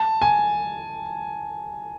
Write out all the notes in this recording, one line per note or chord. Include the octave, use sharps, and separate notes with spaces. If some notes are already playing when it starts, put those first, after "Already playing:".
Already playing: A5
G#5